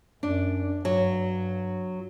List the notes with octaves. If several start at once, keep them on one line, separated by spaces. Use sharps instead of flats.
F#2 D4
G2 F#3